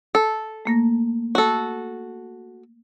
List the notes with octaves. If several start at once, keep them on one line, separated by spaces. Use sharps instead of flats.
A4
A3 A#3 A#6
F#4 A4